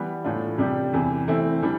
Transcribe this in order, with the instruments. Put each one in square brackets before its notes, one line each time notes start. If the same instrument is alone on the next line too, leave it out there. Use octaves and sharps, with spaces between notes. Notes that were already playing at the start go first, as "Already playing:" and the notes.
Already playing: [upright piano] E3 G3 B3
A2 E3 A3 D4 F4
C3 G3 D4 G4
E2 C3 E3
E3 A3 C4 E4
E3 G3 D4